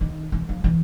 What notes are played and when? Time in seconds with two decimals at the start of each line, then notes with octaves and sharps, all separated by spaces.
0.01 D#3
0.32 E3
0.49 F3
0.64 E3